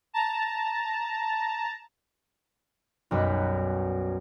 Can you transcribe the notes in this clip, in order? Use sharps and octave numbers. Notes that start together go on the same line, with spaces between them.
A5 A#5
B1 F#2 G3 B4 F#5